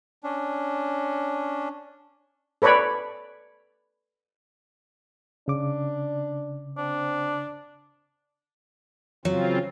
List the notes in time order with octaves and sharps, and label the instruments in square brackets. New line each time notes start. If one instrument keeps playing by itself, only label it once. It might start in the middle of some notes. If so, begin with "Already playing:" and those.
[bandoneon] C#4 D4
[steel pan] A4 B4 C#5 D5 B5
[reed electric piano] C#3 D6 [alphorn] D4
[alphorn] C4 [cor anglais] D4
[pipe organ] C#3 C4 F4 [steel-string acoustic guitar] F#3 [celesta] C#5